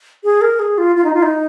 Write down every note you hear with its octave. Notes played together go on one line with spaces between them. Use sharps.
G#4
A#4
G#4
F4
F4
D#4
F4
D#4